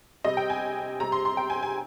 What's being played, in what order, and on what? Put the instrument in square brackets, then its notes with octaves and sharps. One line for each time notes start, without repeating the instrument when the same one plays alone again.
[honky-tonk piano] C3 G3 D#5
G5
G#5
C3 G3 A#5
C6
C6
G5
G#5
G#5